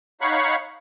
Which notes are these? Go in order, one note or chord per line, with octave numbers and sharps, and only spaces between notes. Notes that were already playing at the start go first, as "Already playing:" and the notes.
D#4 C#5 F5 F#5 B5 C#6